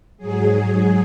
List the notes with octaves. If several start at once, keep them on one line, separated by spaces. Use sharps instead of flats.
G#2 F#3 G#4